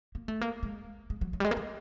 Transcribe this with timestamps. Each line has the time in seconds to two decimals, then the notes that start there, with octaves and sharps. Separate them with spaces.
0.15 A#3
0.28 A3
0.41 A#3
0.63 G#3
1.10 G#3
1.21 F#3
1.33 F#3
1.40 G3
1.45 G#3
1.51 A#3
1.57 A3